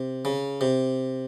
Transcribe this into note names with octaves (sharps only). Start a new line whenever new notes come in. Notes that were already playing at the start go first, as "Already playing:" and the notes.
Already playing: C3
C#3
C3